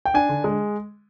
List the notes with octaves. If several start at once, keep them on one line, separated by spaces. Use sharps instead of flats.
G5
D4 G#5
D3
G#3